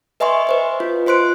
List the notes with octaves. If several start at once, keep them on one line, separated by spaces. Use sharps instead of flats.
B4 D#5 E5 G#5 C6 C#6
B4 C5 D#5
F4
F4 C5 C6 F#6 D7